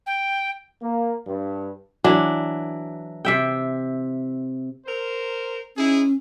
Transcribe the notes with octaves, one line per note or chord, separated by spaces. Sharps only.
G5
A#3
G2
E3 F#3 D4
C3 E5 G5
A#4 C5
C#4 D#4 E4 G#4